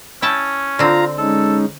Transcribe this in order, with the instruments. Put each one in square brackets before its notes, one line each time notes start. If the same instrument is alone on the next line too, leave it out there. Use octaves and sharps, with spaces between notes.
[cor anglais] C#4 [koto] E4 G5 A5
[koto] D3 C4 [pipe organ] F4 F5 A#5
[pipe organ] G#3 C#4 D#4 [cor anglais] A4